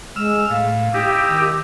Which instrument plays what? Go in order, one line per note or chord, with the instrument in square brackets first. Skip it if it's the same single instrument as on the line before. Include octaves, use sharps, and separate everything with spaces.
[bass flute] G#3 [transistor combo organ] E6 F6
[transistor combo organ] A2 [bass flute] F5
[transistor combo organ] D#4 E4 [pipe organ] G4
[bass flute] D#3